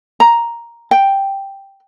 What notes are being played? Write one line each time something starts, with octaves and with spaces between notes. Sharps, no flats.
A#5
G5